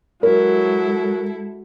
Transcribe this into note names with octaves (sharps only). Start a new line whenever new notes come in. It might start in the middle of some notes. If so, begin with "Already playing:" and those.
F#3 G#3 E4 A4 A#4